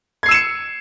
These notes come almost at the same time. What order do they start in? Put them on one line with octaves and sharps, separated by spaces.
G#6 C7 E6 E7 C#7